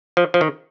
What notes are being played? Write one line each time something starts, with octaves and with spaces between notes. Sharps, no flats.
F3
F3
D#3